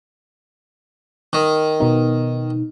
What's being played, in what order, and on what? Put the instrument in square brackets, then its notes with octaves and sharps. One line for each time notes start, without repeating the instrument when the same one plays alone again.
[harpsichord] D#3
[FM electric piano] B2 B3 D#4